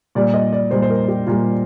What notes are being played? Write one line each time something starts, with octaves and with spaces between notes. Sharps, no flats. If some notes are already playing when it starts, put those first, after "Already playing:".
A#2 G3 D5
D#5
D5
A#2 G3 C5
C5
A#4
G4
A#2 G3 F4